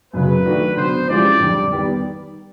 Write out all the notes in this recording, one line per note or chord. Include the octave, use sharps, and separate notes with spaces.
F#2 C#3 F#3 B4
D#3 F#3 A3 D4 F#4
D3 F#3 B3 C5
F3 G#3 C#4 E4 G4 D5
F2 D3 G3
D#3 G3 B3